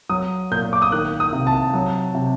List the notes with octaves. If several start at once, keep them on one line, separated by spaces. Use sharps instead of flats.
F#3 D#6
A#2 G6
D6
D#6
D#3 F#6
D#6
C3
A5
F#3
C3